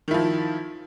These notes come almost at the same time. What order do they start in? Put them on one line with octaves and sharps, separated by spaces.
D#3 E4 F3